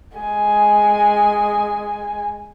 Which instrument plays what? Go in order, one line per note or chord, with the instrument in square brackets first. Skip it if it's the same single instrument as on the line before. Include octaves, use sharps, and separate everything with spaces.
[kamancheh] G#3 G#5